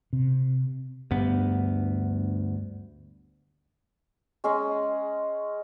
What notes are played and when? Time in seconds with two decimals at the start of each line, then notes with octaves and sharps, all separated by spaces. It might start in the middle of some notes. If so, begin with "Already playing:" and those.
0.13 C3
1.11 D2 G2 B3
4.44 G#3 C#4 G#4 D#5